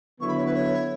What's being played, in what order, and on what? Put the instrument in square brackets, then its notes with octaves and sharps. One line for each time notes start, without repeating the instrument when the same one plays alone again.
[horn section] D3 F#3 B3 E4 [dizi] C#6
[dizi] B5
C#5
B4
C#5